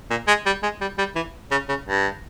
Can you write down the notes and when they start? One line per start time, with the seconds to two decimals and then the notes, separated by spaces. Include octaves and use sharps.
0.11 A#2
0.28 G#3
0.46 G3
0.63 G#3
0.81 G3
0.98 G3
1.15 E3
1.51 C#3
1.69 C#3
1.86 G2